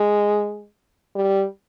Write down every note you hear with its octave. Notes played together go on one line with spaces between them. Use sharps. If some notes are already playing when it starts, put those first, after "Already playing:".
Already playing: G#3
G3